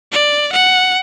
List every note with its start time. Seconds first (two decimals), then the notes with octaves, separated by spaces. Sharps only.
0.12 D5
0.52 F#5